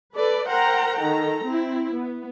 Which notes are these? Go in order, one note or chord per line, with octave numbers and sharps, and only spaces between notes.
A4 B4 D5
A#4 C5 F#5 G5 A#5
D#3 A4 A#5
C4 E4
B3